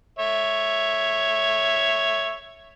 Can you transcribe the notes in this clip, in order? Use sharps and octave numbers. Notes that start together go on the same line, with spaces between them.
C#5 E5